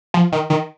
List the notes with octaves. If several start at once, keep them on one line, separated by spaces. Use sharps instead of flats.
F3
D#3
D#3